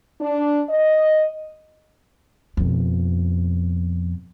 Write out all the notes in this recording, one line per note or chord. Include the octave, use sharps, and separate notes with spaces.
D4
D#5
F2 B2